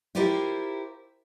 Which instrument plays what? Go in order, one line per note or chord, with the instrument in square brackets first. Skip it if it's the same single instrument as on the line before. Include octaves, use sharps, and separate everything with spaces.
[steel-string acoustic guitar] E4 F4 G4 A#4 C5 E5